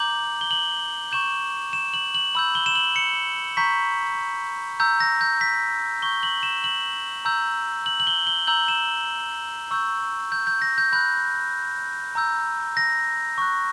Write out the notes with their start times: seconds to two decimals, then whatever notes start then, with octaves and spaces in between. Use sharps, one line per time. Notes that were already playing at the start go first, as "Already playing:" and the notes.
Already playing: A#5 D6 G6 F#7
0.41 G7
0.51 F#7
1.12 C#6 G6 E7
1.73 E7
1.94 F#7
2.15 F#7
2.35 B5 E6 G6 F#7
2.55 G7
2.66 E7
2.75 F#7
2.96 C#7
3.57 A#5 C#6 G6 B6
4.80 A#5 E6 G6
5.00 A#6
5.21 G6
5.41 B6
6.02 C#6 G6 G7
6.23 F#7
6.43 E7
6.64 F#7
7.25 A#5 E6 G6
7.86 F#7
8.00 F#7
8.07 G7
8.27 G7
8.47 A#5 E6 G6 F#7
8.68 E7
9.71 C#6 E6 G6
10.32 G6
10.47 G6
10.62 A#6
10.78 G6
10.92 B5 F#6 G6
12.15 A#5 E6 G6
12.77 A#6
13.38 C#6 F#6